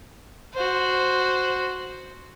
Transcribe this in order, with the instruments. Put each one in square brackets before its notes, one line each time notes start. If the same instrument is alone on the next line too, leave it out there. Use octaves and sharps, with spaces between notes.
[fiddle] F#4 C5